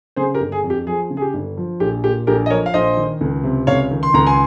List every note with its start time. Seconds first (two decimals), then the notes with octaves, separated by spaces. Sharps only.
0.16 C#3 G#4 C5
0.34 G4 A#4
0.40 G1
0.52 G#4
0.64 F2
0.70 G4
0.87 F3 G#4
1.10 C#3
1.17 G#4
1.22 G4
1.34 G1
1.57 F3
1.80 A#1 G4
2.04 A#2 G4
2.27 A#1 G4 A#4
2.46 D#5
2.50 F3 A#4 C#5
2.66 F5
2.74 A#1 C5 D#5
2.97 D#3
3.21 C#2
3.44 C3
3.67 C#2 C#5 F5
3.91 D#3
4.03 C6
4.14 C#2 A#5
4.26 G#5 C6